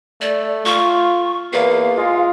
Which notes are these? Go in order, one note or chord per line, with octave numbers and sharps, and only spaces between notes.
A3 D5
F4 C#6
E2 A#3 F5
G#3 F4